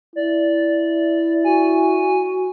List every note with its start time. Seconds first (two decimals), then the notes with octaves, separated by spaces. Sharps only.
0.16 E4 D5
1.44 F#4 G#5